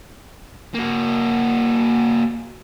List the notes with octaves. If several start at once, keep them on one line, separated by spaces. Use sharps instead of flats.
A#3 F#4